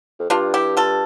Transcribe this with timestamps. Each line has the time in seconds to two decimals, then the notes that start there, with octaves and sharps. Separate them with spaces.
0.19 F2
0.30 G2 D4 F4
0.54 E4 G4
0.77 F4 A4